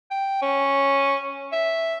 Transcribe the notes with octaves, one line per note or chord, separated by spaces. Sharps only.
G5
C#4
E5